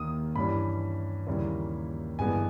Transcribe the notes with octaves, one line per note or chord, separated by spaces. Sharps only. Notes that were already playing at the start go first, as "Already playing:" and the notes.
Already playing: D#2 D#3 A#3 D#6
G2 E3 G3 C#4 B5
D#2 C#3 E3 G3 A#3
G1 G2 E3 G#3 B3 G#5